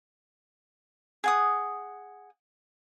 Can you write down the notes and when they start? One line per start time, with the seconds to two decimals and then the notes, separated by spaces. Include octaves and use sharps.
1.24 G#4 F#5 D#6